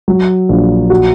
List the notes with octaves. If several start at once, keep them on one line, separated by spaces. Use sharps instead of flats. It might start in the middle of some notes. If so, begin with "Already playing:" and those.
F#3
A#1
F#4